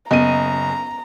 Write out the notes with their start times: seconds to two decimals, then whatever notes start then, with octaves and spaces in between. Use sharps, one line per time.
0.11 F#1 B3 D#5 A#5 D#7